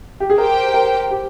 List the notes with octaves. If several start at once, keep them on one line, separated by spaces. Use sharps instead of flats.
G4
G#4
G4 A#4 C5 G5
A#4
G4